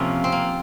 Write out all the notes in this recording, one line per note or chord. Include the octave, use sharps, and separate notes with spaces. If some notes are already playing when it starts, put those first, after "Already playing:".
Already playing: C3 F3 A#3 C#4
C4
A#3